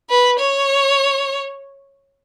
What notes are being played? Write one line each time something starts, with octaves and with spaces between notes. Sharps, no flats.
B4
C#5